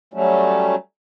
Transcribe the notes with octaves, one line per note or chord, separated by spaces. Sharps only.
F#3 G3 A3 C#4